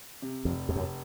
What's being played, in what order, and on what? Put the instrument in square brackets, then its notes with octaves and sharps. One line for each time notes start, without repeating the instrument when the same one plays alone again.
[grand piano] C3
[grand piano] F1 [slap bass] F2
[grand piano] F1 [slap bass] F2
[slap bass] F#2